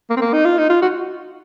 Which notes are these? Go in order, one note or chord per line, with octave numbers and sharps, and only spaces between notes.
A#3
C4
A#3
D#4
F4
D#4
F4
F#4